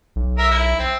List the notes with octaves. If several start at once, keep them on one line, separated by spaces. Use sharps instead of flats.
B1
A#4 E5
E4
C4